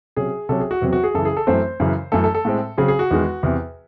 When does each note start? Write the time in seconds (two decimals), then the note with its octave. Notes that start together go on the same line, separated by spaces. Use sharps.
0.16 C3 F#3 C#4 G#4
0.49 C3 F#3 C#4 A4
0.60 G#4
0.71 F#4
0.82 E2 C3 F#3 C4
0.93 F#4
1.03 G#4
1.14 F#2 C#3 E3 A4
1.25 G#4
1.37 A4
1.47 F#2 E3 A3 C4 C5
1.80 F#2 C#3 E3
2.12 F#2 E3 A3 A4
2.24 A4
2.35 A4
2.45 A2 G#3 C4
2.77 C#3 F#3 C4 G#4
2.88 G#4
2.99 F#4
3.11 E2 D#3 G#3
3.43 E2 C3 E3